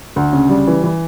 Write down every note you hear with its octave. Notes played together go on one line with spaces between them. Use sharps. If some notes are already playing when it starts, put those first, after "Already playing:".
D2
C#3
G3
E3
E3